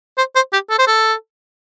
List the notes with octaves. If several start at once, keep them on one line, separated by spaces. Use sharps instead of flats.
C5
C5
G4
A4
C5
A4